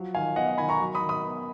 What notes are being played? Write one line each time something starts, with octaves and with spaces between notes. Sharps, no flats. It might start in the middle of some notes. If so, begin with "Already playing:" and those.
Already playing: F3 F#3
D#3 F5 G#5
B3 D#5 F#5
D#5
D#3 G#5 B5
A#5 C#6
F#3
B5 D#6
D#3
B5 D#6
B3